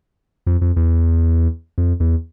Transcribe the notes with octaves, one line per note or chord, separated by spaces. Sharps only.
F2
F2
E2
F2
E2